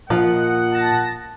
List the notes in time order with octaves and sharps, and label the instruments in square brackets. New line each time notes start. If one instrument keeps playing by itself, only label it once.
[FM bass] A#2 [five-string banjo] F3 F4 [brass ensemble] A#3 D#5 F#5
[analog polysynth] A5 A#6